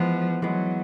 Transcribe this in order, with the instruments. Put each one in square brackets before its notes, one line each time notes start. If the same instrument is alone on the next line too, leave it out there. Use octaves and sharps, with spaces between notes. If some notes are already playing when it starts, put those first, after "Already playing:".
Already playing: [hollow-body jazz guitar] E3 G#3 B3 [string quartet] F3
[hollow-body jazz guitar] E3 G#3 B3 [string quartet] F#3